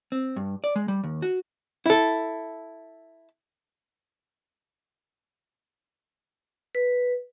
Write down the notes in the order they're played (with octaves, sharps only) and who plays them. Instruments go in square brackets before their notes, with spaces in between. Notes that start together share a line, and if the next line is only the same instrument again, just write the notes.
[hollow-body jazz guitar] C4
G2
D5
G#3
G3
D#2
F#4
E4 A4
[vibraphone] B4